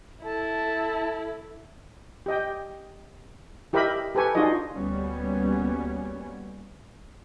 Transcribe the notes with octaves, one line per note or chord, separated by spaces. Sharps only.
E4 A4 A5
G4 D#5 G5
E4 G4 A#4 D#5 E5 B5
G4 A4 B4 G#5 C#6
D4 D#4 F4 F#4 G#4 D#5
D2 G3 A#3 B3 C#4